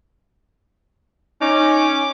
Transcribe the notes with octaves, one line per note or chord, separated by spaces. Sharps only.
C#4 D#4 D6